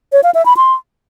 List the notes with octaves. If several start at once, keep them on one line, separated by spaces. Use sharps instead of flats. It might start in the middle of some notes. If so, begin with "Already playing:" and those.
C#5
F5
E5
B5
C6